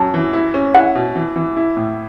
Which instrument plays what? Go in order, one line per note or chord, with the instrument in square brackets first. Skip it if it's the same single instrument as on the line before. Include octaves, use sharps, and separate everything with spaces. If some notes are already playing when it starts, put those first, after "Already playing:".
Already playing: [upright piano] F#2 C#4 [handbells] A5
[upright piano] E3
E4
C#4
[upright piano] E4 [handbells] F#5
[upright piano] B2
E3
E3
E4
A2